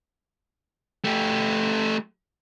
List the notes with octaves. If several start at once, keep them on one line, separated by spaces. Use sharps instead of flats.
A3 G4